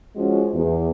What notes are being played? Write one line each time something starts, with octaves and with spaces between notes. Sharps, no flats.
F3 G#3 C#4 F#4
E2